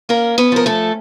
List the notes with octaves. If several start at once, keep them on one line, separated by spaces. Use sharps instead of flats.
A#3 C#4 A#4
B3 B4
F3 A#4
A3 A4